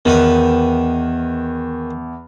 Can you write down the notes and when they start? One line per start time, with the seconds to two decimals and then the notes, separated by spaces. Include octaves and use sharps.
0.05 E2 D#3 B4